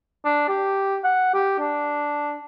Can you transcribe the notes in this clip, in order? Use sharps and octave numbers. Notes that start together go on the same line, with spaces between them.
D4
G4
F#5
G4
D4